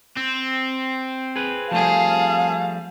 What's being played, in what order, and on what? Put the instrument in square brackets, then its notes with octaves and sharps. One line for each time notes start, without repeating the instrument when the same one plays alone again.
[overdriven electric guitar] C4
[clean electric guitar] G#4 B4
[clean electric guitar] F3 G3 A3 [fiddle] G#4 A5 [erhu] F5